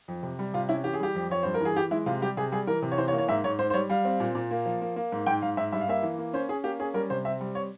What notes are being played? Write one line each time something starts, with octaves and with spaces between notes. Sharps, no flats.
F2
C3
G3
C3 F4
C#4 E4
E3 G4
G#4
G3 G4
F2
F2 C#5
G2 C5
A#4
E3
G#4
E3 G4
G#3 E4
C3 F4
G3 G4
C3 G#4
G3 G#4
E3 A#4
C3
C#5
E3 C5
C#5
A#3
C#5
G#2 E5
G#2 C#5
G#2 C5
C5
G3 C#5
G3 F5
C4
A#2
A#2
A#3
F3
A#3
A#3
G#2
G#2 G5
G#2 F5
G#2 E5
G2 E5
F5
A#3 E5
E3
A#3
C#4 C5
C#4 G#4
A#3 G4
C#4 G#4
G3 A#4
C3 C5
C4 E5
G3
C#5